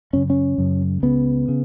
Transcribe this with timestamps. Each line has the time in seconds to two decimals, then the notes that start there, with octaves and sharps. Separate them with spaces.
0.13 F#2 C#3 C#4
0.30 C#4
0.58 F#2 C#3
1.03 C#2 C#3 B3
1.48 C#3